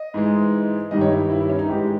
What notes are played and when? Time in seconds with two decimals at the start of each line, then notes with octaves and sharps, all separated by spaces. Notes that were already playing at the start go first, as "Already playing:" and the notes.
Already playing: D#5
0.14 G#2 E3 G#3
0.91 G2 D#3 G3 D#5
1.01 C#5
1.11 E4
1.30 E4
1.41 E4
1.50 C#4
1.59 D#4
1.69 G#2 E3 G#3 G4